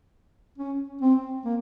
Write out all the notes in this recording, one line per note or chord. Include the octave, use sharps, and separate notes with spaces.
C#4
C4
A#3